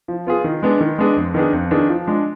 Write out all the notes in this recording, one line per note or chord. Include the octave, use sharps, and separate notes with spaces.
F3
B3 F4 G#4
D#3
G#3 B3 D4 G#4
D#3
G#3 B3 D4 G#4
F2
D#3 B3 D4 G#4
F2
D#3 B3 D4 G#4
F3
G#3 D4